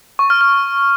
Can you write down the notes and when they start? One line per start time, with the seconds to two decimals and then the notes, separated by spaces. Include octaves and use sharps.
0.19 C#6
0.30 F6
0.41 F6